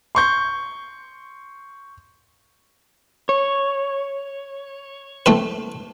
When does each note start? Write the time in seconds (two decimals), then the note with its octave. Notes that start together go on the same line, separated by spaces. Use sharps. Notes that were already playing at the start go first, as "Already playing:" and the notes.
0.15 C6 C#6 G6
3.29 C#5
5.26 A3 C4 B4